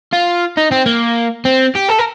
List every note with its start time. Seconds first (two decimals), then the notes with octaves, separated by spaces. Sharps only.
0.13 F4
0.57 D#4
0.71 C4
0.86 A#3
1.45 C4
1.75 G4
1.89 A4
1.99 A#4